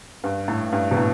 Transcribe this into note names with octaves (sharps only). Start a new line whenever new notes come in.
G2
A2
G2
B2
A2